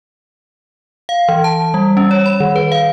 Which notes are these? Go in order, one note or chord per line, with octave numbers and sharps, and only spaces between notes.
F5
E3
A5
G3
C#4
C#5
B5
D#3
B4
F5